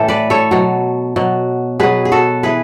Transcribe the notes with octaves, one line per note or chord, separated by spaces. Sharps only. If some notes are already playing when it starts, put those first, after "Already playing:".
Already playing: A2 E3 A4
B4 D5
A4 C#5
B2 F#3
B2 F#3
B2 F#3 G#4 B4
G#4
F#4 A4
E3 G#4 B4